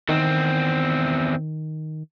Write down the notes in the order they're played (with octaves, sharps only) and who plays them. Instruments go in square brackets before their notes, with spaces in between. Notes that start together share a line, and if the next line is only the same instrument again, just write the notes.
[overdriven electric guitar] E2 C4 [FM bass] D#3